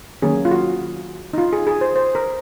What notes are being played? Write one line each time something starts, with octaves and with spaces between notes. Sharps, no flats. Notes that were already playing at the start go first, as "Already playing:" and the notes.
D#3 F#3 A#3 C#4 G#4
F4
F#4
D#4
F4
G#4
G#4
C5
C5
A#4